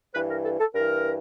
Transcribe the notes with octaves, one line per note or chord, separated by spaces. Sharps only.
G2 E3 B4
A#4
A4
A4
G2 E3 A#4